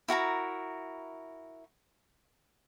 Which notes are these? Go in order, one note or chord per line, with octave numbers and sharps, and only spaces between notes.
E4 F#4 A#4 A#5